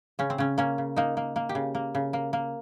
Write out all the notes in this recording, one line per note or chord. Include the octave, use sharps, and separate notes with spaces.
C#3 C#4
C4
C#3 C#4
A#3 C#4
C#3
A#3 D#4
A#3
A#3
G4
C#3
A#3
C#3
A#3
A#3